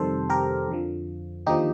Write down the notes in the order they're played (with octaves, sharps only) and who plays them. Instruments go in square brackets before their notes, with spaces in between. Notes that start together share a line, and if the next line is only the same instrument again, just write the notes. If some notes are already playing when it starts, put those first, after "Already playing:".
Already playing: [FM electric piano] F2 C3 D#3 G3 A4 C5
G4 A#4
F2 D3 F3
D#2 D3 F3 D#4 G4